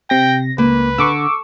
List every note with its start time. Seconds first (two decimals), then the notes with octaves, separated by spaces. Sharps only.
0.10 C3 G5 A#6
0.58 C#2 A#3 B4
0.98 D3 C#6 D6 E6